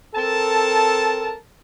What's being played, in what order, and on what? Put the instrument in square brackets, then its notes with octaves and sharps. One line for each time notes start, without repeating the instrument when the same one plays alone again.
[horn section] C4 A4 A#4 A5